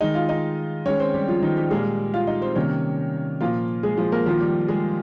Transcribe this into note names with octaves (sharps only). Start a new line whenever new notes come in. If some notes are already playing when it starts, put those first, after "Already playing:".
D#3 G#3 D#4 D#5
F4 F5
D#4 D#5
D#3 G#3 C#4 C#5
C4 C5
G3 G4
F3 F4
D#3 D#4
G3 G4
A#2 G3 G#3 A#3 G#4
F4 F5
D#4 D#5
C4 C5
C3 D#3 G3 A#3 C#4 C#5
A#2 F3 A#3 F4 F5
G#3 G#4
F3 F4
A#3 A#4
D#3 F3 A#3 F4
G3 G4
G#3 G#4